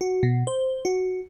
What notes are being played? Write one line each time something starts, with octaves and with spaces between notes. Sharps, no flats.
F#4
B2
C5
F#4